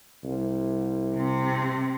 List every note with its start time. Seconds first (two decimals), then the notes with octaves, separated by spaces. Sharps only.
0.24 C2
1.16 C3 C4